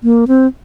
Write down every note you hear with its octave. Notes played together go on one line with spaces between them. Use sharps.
A#3
C4